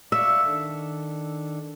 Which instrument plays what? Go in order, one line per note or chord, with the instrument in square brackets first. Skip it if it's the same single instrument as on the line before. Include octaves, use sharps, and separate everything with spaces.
[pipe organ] D5 F5 C#6 [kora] E5
[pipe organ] D#3 D4 A4